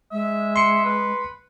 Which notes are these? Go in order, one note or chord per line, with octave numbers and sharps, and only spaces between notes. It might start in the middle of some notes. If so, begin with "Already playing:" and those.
G#3 E5
C6 C#7
B4